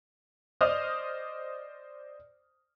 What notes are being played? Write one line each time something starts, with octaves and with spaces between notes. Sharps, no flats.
C5 D5 D#5 D#6 F6